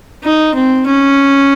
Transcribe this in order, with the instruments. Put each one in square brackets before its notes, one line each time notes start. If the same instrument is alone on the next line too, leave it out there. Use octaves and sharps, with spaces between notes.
[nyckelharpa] D#4
C4
C#4